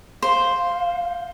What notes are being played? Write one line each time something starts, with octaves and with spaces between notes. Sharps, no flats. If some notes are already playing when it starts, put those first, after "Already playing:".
C5 F5